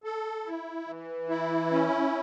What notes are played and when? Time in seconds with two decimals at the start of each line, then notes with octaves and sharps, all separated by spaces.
0.04 A4
0.46 E4
0.87 E3
1.29 E4
1.71 C#4